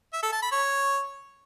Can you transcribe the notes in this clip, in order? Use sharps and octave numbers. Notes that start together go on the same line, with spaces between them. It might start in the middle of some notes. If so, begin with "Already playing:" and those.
E5
A4
A5
B5
C#5